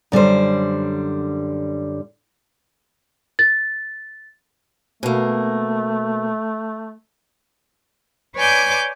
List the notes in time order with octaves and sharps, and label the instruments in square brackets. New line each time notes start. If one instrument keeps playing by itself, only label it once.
[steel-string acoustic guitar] F#2 D3 G3 C5
[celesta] A6
[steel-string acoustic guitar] B2 A#3 [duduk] A3
[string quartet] B4 C#5 D5 G#5 D6 G6